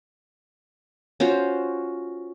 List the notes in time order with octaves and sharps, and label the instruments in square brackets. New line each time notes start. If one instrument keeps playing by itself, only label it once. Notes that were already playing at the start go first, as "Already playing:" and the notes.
[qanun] C#4 F4 F#4 C5